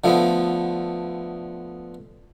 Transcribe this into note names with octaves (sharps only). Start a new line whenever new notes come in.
D3 F3 A3 B3